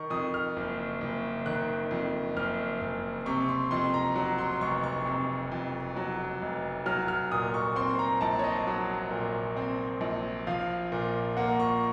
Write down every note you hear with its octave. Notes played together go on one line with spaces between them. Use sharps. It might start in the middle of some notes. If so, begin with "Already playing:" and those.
Already playing: D#3 C#6
F2 D#6
F6
F#1
F#1
D#3 F#6
F2
F#1 F6
F#1
C3 C#6
C6
F2 C6
A#5
F#3
C6
F1 C#6
C#6
C3
F2
F#3
F1
F#3 F6
F6
A#2 D#6
C#6
C4 C6
A#5
A#1 A5
C#5
D#5
F#3
A#2
C4
A#1
F3 F5
A#2
A#3 F#5
C#6